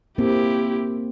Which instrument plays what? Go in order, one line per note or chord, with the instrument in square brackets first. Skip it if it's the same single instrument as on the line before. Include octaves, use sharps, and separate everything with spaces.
[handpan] A#3 C4 [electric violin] E4 G4